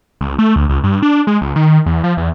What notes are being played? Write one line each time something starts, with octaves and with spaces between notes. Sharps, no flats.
C#2
A3
D2
C#2
G2
D4
G#3
C#2
D#3
E2
F3
E2